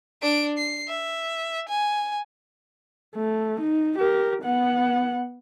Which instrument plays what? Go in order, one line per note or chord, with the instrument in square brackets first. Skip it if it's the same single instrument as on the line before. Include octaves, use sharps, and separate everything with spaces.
[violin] D4 D7
C7
E5
G#5
[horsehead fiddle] A3
D#4
G4 A#4
B3 F#5